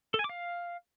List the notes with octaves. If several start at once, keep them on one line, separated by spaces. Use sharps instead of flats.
A4
G#5
D6
F5